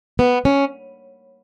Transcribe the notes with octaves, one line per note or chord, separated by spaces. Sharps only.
B3
C#4